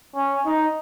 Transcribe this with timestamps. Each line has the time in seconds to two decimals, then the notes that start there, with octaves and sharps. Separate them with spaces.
0.15 C#4
0.46 D#4